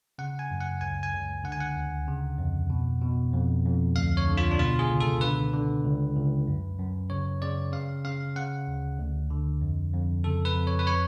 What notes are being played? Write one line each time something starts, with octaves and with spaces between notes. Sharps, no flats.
C#3 F#5
G#5
F#2
F#5
C#2 G#5
G#5
C#2
D3 F#5
G#5
F#5
D2
C#3
F2
B2
B2
F2
F2
D2 F5
C#5
D3
F4
D4
B2 F4
G#4
C#2
A4
D3 B4
D3
C#2
C#2
F#2
F#2
C#3 C#5
C#3 D5
C#3 F5
C#3 F5
C#3 F#5
D2
D2
D3
F2
F2
C#3 A4
B4
F2
C#5
B4
C#5